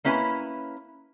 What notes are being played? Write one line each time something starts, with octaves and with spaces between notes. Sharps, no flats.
A#3 C#4 E4 B4 G#5